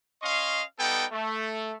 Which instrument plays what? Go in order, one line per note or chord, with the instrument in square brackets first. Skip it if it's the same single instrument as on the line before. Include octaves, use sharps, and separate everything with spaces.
[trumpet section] C#4 D#5 F5 C6 C#6
G3 B3 D#4 A4 G5
A3